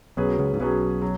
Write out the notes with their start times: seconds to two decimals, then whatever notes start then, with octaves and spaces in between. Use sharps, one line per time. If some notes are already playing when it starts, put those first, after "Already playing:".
0.17 B1 B2 F#3 C#4 G#4 B4
0.39 C#2 C#3
0.54 G#2
0.60 B1 B2 F#3 C#4 G#4 B4
1.02 F#3